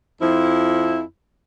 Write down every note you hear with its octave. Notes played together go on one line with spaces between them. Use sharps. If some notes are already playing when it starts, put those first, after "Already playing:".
F2 F3 E4